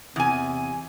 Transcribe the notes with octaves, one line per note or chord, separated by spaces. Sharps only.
E2 C3 G#5